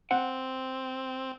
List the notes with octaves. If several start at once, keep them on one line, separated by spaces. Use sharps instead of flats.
C4 F#5